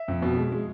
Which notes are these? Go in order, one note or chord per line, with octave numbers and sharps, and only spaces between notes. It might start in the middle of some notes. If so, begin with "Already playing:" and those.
Already playing: E5
F2
B2
G#3
G#3